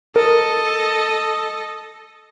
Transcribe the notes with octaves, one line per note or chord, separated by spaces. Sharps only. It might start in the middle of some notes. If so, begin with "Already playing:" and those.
A4 A#4 D#5